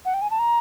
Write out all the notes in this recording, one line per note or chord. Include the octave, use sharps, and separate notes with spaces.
F#5
G5
G#5
A5
A#5